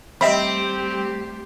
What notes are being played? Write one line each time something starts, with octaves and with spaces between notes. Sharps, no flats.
G3 A3 C4 G4 D#5 E5 B5